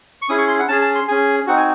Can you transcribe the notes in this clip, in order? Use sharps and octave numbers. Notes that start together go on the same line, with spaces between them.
C#6
C#4 E4 G#4 D#6
C#6
C6
F#5
C#4 G#4 A5
A5
C6
C#4 G#4 G#5
C4 D#4 F#4 F#5
G#5